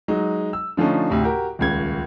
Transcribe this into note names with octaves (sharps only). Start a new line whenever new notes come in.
F#3 G#3 D#4
E6
D3 F3 A3 C#4 D#4
D2 A2 C3
F#4 G4 A#4
D#1 C#2 G#6